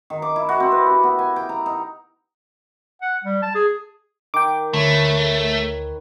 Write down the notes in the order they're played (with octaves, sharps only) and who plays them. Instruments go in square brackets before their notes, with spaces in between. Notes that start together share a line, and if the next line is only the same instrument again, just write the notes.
[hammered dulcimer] D#3
D6
E4
F#4
C4
B4
G4
B3
G#5
G5
A#5
D#4
[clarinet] F#5
G3
A5
G#4
[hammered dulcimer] D#3 [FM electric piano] G5 D6
[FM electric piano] D2 [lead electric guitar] A3 [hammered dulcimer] B4 C#5